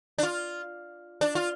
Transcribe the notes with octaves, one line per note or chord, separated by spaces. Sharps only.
D4
F4
D4
F4